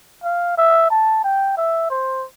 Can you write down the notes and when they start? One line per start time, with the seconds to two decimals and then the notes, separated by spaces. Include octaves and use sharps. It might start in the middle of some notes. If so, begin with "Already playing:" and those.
0.24 F5
0.58 E5
0.90 A5
1.24 G5
1.57 E5
1.90 C5